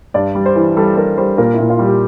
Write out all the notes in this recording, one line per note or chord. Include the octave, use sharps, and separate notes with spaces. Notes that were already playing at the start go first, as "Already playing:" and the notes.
G2 D5
G3
C5
E3
G3 A4
G3 A#4
G3 C5
A#2 A#4
A#2 E4
F4
G3
G4